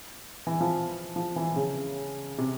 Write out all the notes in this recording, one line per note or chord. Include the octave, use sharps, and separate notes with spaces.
E3
F3
F3
E3
C#3
C3